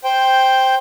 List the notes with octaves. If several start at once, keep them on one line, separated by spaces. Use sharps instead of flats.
C5 G5